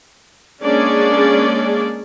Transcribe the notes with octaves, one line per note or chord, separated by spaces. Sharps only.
G#3 A#3 C#4 D4 G#4 D5